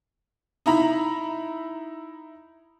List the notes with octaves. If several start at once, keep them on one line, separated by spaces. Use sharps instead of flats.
D#4 E4 A#5 B5